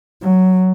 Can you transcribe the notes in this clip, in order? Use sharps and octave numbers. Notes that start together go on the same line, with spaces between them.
F#3